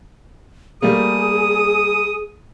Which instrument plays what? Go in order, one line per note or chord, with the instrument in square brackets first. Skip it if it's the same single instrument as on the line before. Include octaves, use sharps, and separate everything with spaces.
[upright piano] G3 A3 A#3 [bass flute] G#4 [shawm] D#6